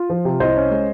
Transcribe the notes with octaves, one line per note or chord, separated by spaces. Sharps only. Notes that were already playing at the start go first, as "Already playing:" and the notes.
Already playing: F4
F3
C3
C2 C5 D#5
C#4
G#3